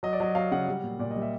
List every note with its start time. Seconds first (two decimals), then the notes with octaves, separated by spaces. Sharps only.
0.03 F#3 D#5
0.13 D5
0.20 F#3 D#5
0.35 F#3 F5
0.52 C#3 F#5
0.68 G3
0.83 A#2
0.99 A#2 D5
1.11 D#5
1.16 G3
1.22 E5